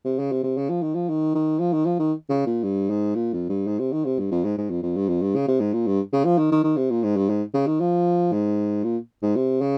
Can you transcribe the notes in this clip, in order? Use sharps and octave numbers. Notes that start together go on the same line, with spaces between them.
C3
C#3
C3
C3
C#3
F3
D#3
F3
D#3
D#3
F3
D#3
F3
D#3
C#3
A#2
G2
G#2
A#2
F2
G2
G#2
C3
D#3
C3
G2
F2
G#2
G#2
F2
F2
G2
F2
G2
C#3
C3
G#2
A#2
G2
C#3
F3
D#3
D#3
D#3
C3
A#2
G#2
G2
G#2
C#3
D#3
F3
G#2
A#2
G#2
C3
C#3